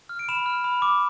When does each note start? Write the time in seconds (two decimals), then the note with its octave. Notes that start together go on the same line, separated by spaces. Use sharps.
0.09 F6
0.19 D7
0.29 B5 E7
0.46 F6
0.64 B5
0.82 D6